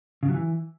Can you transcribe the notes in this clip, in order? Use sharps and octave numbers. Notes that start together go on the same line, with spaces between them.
C#3
F#3
E3